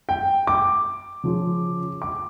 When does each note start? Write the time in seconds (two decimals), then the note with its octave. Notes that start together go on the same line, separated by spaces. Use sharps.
0.09 G5
0.47 D6
1.23 C#3 F3 C#4
2.02 D6